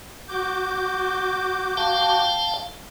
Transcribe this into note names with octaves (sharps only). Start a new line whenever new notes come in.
F#4 D6 G6
F5 G5 A5